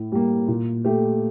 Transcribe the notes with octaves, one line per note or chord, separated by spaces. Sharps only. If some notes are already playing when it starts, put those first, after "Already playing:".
Already playing: A2
G3 A#3
A#2
A3 G4